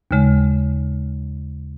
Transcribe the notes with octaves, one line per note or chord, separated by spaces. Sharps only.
D#2 C#3 G#3